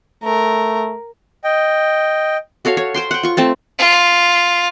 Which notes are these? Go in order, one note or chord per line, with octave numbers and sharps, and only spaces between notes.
A3 A#4
D#5 G5
F#4 A4 C#5 F5
C#5
C5 G5 C6
F#5 G5
F4 C#6
A3 C4 A5
F4